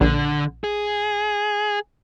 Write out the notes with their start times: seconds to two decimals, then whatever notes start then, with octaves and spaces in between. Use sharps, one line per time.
0.01 A#1 D3
0.64 G#4